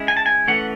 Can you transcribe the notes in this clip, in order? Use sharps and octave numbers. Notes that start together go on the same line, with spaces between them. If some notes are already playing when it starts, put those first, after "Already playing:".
Already playing: G#3 C#4 E4
G#5
A5
G#5
E3 A3 C#4 F#5